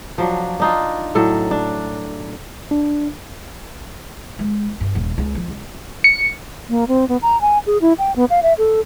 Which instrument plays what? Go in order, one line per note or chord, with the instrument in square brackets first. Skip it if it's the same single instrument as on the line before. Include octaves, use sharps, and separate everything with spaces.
[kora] F3 F#3 D4
D4 D#4 F4
A2 F#3 A4
D4
[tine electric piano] D4
[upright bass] G#3
G2
D#1
C#2
F3
C#2
[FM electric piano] C#7
[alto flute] A#3
C4
B3
A#5
G#5
G#4
E4
G5
B3
F5
E5
A4